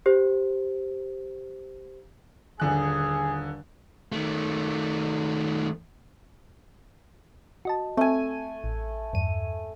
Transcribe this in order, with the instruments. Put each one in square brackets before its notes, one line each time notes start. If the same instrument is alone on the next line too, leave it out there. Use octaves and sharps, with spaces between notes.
[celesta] G4 C5
[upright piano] D#1 D3 F#6 [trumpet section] G#4
[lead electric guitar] D#3 A3
[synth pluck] F#4 D#5 A5
[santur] A3 G#5 [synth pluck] C4
[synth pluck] A1
E2 G2 D#7